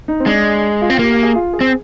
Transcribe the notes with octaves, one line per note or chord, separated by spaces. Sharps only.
D#4
C4
G#3 D4
F4
C4
A#3 G4
G4
G#4
F4
G#4
C4